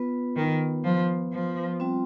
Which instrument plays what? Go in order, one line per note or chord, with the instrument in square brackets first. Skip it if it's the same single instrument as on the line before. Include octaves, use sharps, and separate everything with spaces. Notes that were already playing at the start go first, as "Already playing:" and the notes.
Already playing: [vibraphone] B3 F4 B4
[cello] D#3
F3
F3
[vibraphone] G3 C4 F4